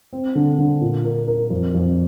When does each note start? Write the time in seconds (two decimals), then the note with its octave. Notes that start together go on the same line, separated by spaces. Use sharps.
0.13 C4
0.35 D3
0.58 D3
0.81 A#2
1.05 A#4
1.28 A#4
1.50 F2
1.75 F2